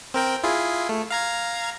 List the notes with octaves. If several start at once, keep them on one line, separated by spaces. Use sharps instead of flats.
C4 A#4 G5
E4 F4 G#4
A3
F5 A#5 G#6